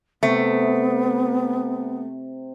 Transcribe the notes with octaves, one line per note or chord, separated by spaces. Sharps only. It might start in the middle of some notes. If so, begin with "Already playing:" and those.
C3 A3 B3